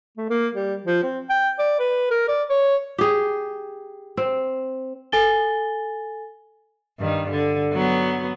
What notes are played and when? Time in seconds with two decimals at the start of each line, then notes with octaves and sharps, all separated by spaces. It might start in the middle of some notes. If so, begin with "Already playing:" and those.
0.17 A3
0.30 A#3
0.55 G3
0.86 F3
1.03 C4
1.30 G5
1.59 D5
1.79 B4
2.11 A#4
2.28 D5
2.50 C#5
2.98 G4 G#4
4.17 C4
5.12 A4 G#5 A6 G7
6.99 G2 D#3
7.30 D3
7.73 F#3 B3